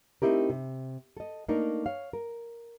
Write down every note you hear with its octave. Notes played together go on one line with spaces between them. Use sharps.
A3 C4 D#4 E4 G4 A#4
C3
A4 D#5
A3 A#3 D4 D#4 A#4
C#5 F5
A#4